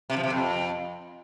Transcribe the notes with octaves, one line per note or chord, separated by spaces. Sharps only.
C3
F3
C3
F2